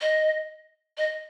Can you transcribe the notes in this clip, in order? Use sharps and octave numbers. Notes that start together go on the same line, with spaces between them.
D#5
D#5